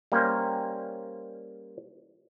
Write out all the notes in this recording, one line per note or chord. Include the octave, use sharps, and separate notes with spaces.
G3 A#3 C#4 A#4 C5